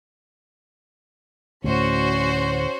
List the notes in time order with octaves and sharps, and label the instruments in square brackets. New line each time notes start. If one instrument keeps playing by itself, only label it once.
[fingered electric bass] D2 A2 [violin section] C#4 F#4 C5